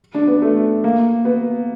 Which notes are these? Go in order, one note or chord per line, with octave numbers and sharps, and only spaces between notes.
D4
B3
A3
A#3
B3